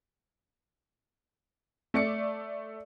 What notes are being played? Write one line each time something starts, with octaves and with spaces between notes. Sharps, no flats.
A3 D5 C#7